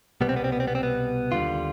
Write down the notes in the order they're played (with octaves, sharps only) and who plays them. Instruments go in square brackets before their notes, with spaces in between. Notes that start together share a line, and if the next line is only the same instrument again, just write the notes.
[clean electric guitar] C2 B2 G3 B3
C4
B3
C4
B3
C4
B3
C4
B3
D#2 D3 G3 F4